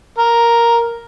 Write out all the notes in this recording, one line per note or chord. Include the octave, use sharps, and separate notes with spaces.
A#4